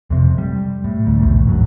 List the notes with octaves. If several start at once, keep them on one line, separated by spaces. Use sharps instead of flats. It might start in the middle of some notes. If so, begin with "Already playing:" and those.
F2 C3
G3
A2
D2
B1 E2 A2
A#1 F#2 F#3